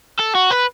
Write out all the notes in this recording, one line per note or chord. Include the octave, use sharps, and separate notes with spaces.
A4
F#4
B4